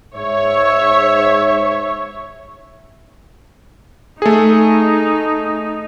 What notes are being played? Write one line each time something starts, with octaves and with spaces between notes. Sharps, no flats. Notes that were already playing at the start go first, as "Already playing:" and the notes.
G#2 C#5 E5
A3 D#4 G#4